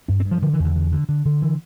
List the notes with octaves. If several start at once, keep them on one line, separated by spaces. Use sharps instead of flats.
G2 D4
C4
G2
F3
D3 F3
E3
E2 D3
D3
D3
D3
D3
E3